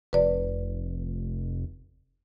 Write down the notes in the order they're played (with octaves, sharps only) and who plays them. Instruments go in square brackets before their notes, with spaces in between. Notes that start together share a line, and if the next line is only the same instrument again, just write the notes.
[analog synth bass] F1 [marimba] B4 D5